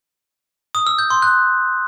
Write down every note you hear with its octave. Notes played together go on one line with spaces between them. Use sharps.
D#6
E6
G6
C6
F#6